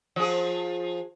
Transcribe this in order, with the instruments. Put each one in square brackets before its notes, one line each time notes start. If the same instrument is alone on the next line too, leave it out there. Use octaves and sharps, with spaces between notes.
[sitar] F3 G#4